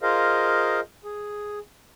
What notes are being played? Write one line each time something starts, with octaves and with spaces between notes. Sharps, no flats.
F4 G#4 A#4 C5 D#5 F5
G#4